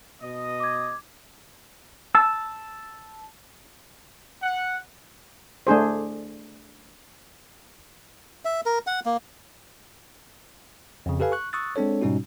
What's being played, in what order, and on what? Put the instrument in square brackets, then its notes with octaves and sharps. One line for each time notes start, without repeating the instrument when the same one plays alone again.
[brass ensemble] B2 D#5
[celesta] D6 G#6
[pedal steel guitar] A5 E6
[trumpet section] F#5
[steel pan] A3 D4 G#4 C5
[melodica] E5
A#4
F#5
A#3
[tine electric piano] F2 C#3
G4 A4 B4 F5 G#5
C#6 F#6
C#6 D#6 E6 F#6 A6
G#3 C4 D4 A4 C#5
G#2 B2 G3 C#4 D#4 F#4